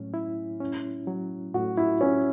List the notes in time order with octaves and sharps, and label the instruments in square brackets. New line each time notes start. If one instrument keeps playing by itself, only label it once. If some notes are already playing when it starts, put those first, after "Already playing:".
Already playing: [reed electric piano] A2 F#3 [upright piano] C#4
[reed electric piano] E4
C#4
F#3
[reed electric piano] A2 [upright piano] F#4
[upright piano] E4
[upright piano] C#4 [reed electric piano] E4